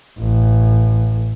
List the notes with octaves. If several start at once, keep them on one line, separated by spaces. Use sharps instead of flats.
A1